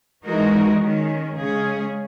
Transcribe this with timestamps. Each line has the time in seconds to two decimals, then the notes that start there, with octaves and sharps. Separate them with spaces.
0.24 E3 G#3 D#4 F#4 A#4
0.80 D#3 G#3 C#4
1.35 C#3 G#3 C#4 G#4